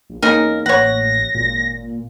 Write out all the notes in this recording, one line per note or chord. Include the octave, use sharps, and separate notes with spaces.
A#1
E2 A#3 C#4 D#4 A#4
A1 C#5 F#5 A#6
G#1 A#2